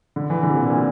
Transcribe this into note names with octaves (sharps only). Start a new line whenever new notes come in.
D3
E3
D3
C3
A#2
A#2